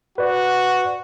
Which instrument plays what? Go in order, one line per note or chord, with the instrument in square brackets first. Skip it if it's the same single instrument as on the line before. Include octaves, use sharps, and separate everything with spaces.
[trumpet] F#4 [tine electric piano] B4 D5